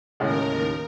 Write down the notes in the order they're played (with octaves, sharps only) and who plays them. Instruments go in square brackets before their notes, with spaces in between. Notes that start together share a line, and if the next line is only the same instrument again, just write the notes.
[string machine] D#2 A#4 [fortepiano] A2 C#3 G#3